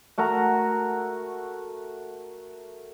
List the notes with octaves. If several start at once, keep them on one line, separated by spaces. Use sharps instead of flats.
A3 F#4 A#4 A#5